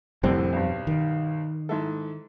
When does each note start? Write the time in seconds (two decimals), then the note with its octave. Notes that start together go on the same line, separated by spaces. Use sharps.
0.23 C2 F2 A2 D3 G3 C4
0.53 B1 G2
0.87 D#3
1.69 G#2 E4 A4